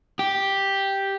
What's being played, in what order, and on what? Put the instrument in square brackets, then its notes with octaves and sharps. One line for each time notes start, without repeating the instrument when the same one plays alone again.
[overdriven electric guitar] G4